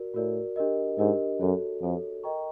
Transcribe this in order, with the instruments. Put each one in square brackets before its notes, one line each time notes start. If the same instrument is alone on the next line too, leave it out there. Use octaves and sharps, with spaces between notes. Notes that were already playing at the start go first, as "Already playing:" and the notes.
Already playing: [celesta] F#4 A#4 D5
[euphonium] A2 [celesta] F#4 A#4 D5
[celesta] D4 G4 A#4 D#5
[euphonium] G#2 [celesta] D4 G4 A#4 D#5
[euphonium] F#2 [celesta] F#4 A4 C#5
[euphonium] F2 [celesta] F#4 A4 C#5
[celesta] A#4 D#5 G5 A#5 C#6